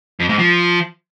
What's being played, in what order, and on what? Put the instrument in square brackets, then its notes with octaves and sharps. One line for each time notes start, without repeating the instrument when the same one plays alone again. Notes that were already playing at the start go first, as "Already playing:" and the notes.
[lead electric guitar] F2
G#2
F3